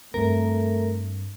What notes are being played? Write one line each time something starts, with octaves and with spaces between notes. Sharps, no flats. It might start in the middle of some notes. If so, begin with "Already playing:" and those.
G2 A3 C4 A#4